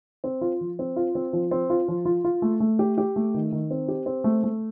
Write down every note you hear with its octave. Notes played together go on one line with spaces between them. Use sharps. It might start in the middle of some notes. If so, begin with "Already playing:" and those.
C4
F4
F3
C4
F4
C4
F3
C4
F4
F3
F4
F4
A3
A3
G4
G4
A3
D#3
D#3
C4
G4
C4
A3
A3